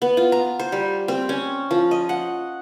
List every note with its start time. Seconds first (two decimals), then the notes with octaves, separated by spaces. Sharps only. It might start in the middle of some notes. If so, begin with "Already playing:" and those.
0.02 B3
0.17 F4
0.32 A#5
0.59 C5
0.72 G3
1.08 C4
1.29 C#4
1.71 F3
1.91 D#5
2.09 F#5